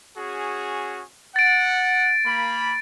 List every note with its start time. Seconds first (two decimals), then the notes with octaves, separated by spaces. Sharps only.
0.17 C#4 F#4 G#4
1.36 F#5 A6 D7
2.26 A#3 B5